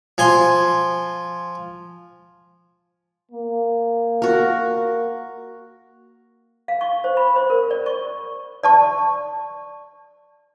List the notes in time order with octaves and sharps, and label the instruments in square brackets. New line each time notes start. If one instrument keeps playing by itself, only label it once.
[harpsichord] F3 G#5 C6
[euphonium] A#3
[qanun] F#4 A#4
[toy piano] F5
C#6
C5
B5
C5
A#4
D5
C#6
D5 A5 C#6